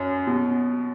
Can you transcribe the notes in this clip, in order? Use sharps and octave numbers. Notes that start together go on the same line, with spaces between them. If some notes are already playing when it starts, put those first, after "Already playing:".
Already playing: F#2
B2